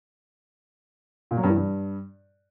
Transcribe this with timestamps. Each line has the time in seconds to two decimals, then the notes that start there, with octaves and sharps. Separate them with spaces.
1.31 A#2
1.37 F#3
1.43 G2
1.50 E3
1.56 G2